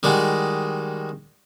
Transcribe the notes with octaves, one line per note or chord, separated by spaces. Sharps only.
D#3 G3 G#3 F#4